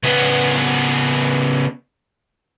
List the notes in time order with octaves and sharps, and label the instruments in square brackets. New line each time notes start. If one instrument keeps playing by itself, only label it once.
[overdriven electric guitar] C#3 B3